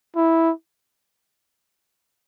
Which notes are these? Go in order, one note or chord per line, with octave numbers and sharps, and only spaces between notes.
E4